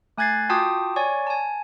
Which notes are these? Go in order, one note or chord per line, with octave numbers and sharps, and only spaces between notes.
A3 G#5 F#6 G#6 A6 C7
F4 F#4 G5 A5 D6 D#6
C#5 D5 G#5 C#6
G#5 A5